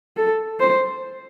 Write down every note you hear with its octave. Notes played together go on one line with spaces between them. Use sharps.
A4
C5